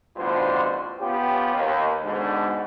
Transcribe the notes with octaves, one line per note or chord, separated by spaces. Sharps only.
A1 G2 B2 D3 F4 C5
B3 C#4 F4 G4
D#2
G#2 B2 D3